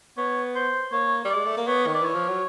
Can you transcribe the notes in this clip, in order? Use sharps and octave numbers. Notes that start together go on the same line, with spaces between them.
B3 C#5
C5
A#3 C#5
G3
G#3 D5
A3
A#3
B3 C#5
D#3
D5
E3 C#5
F3
F#3